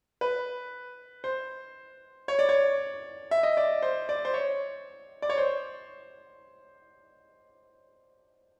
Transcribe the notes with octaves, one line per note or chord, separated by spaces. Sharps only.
B4
C5
C#5
D5
C#5
E5
D#5
D5
C5
D5
C5
C#5
D5
C#5
C5